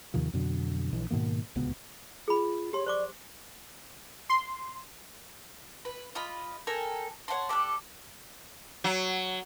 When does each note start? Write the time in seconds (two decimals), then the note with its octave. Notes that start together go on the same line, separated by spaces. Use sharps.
0.14 D#2 C3 D#3 F3
0.33 F2 B2 D3 F#3
0.93 A#1 E3
1.11 G#2 B2 D#3 A#3
1.56 D1 C#2 B2 B3
2.28 F4 G#4 B5
2.73 G4 C#5 C6
2.86 C5 D5 C#6 D6
4.29 C6
5.85 B4
6.15 F4 D#5 B5
6.67 A4 A#4 G5 G#5
7.28 C#5 F#5 A5 C6
7.49 G4 A4 D5 F#6
8.84 F#3